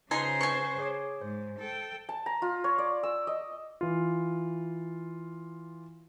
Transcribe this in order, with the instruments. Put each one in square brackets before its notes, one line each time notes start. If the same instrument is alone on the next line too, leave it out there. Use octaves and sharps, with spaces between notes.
[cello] C#3 C5 [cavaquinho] D#4 G#5 C6 [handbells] F4 B4
[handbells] B4 C#7 [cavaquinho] G#5 C#6
[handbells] G#4 C#5 D6
[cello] G#2 [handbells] C5
[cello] A4 G5
[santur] A5
A#5
F4
C#5
D5
E6
D#5
[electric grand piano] E3 F4